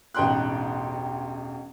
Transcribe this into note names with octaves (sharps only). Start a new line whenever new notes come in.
E1 A1 D#4 G5 C6 F#6